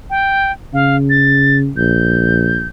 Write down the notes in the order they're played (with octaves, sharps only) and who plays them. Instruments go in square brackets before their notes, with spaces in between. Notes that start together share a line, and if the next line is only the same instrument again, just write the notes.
[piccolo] G5
[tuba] C#3 [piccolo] F5
[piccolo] A6
[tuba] A#1 [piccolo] G6